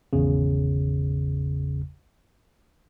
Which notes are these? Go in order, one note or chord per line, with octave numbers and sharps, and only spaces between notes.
G#1 E2 C#3